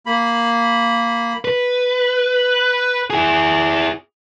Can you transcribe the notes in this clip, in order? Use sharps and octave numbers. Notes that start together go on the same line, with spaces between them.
A#3 B5
B4
E4 G#4